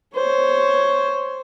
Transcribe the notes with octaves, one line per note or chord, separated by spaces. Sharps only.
C5 C#5